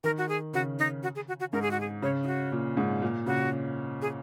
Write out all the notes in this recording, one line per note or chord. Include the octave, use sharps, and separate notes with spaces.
D#3 A#4
F#4
G#4
C#3 F#4
D#4
F#4
G#4
F#4
F#4
G#2 A#4
G#4
F#4
G#4
C#3 C#5
D#4
F#4
A#2
G#2
A#2
C#3 F#4
G#4